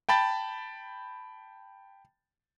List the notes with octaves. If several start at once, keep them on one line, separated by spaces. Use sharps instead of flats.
G5 A5 B5 A6